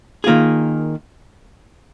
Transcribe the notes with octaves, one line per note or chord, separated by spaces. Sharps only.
D#3 A#3 F4 G#4